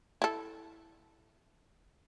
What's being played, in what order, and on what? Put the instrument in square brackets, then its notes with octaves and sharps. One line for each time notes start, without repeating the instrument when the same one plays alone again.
[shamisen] E4 A4